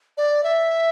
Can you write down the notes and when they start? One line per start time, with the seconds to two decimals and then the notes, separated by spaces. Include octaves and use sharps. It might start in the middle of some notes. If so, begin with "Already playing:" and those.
0.17 D5
0.44 E5